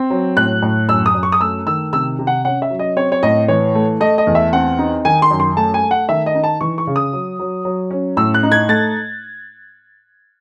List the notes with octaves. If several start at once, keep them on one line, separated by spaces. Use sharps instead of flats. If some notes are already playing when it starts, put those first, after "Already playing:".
Already playing: C4
F#3
A2 F#6
A2
F#2 E6
D#6
F#2
C#6
D#6
A3 E6
D#3 E6
C3 E6
C3
F#5
C#4 F#5
E5
F#3
D#5
C4 C#5
C#5
A2 D#5
E3 C#5
A3
A3 D#5
D#5
E2
E5
C4 F#5
D#4
D#3 G#5
C6
F#2
C6
A3 A5
G#5
A3
F#5
D#3 E5
D#5
D#4
A5
E3 C#6
C#6
C#3
D#6
F#3
F#3
F#3
C#4
A2 E6
F#6
D#4
G#6
A3 A6